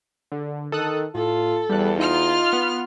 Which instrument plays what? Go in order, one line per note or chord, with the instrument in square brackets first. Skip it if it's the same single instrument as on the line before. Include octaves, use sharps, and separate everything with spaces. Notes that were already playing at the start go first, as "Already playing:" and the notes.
[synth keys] D3
[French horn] D#3 [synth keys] A4 D#6 F#6
[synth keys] A2 [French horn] F4 [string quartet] A4
[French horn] E2 [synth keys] G3 F#6
[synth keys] D#4 [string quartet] F4 F6
[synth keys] B3